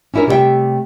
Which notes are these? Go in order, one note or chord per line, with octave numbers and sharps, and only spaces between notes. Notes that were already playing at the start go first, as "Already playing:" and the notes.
C#4 D4 E4 G4 A#4
C3 G3 A3 D5 E5 G5